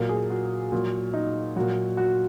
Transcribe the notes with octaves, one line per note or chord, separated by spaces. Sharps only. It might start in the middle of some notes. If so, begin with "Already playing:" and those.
Already playing: A#2 F#3 A#4
G#4
F#4
A#2 F#3
D#4
A#2 F#3 F#4
F#4